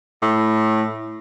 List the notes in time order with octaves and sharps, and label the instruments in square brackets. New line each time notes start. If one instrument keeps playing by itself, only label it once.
[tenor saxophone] A2